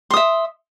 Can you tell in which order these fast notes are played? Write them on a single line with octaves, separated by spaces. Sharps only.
C6 D#6 E5